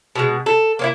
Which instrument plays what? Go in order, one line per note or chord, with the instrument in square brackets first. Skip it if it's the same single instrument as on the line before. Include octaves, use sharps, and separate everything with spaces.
[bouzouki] B2 G#3
A4
A#3 C#4 E4